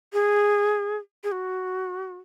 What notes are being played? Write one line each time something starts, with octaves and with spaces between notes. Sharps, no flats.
G#4
G#4
F#4